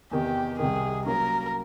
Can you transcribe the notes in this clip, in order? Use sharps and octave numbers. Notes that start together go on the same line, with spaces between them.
E2 C3 D#3 G4
C2 C3 D#3 G#4
F#3 A#3 C#4 A#4